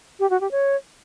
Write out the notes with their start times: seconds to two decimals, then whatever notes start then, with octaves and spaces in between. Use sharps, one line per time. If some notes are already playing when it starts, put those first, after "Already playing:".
0.20 G4
0.30 F#4
0.41 G4
0.51 C#5